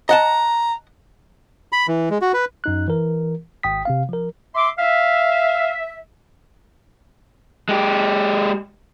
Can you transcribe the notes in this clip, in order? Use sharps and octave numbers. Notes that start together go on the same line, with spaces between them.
D#5 F#5 A5 A#5
B5
E3
G#3
F#4
B4
F#2 D#4 F#6
E3 A#4
G#1 G5 D#6 B6
C3 C4 F5
F3 A#4
E5 C6 D6
E5 F5
G#3 G4